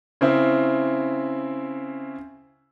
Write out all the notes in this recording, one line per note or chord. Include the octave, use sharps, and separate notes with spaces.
C#3 C4 E4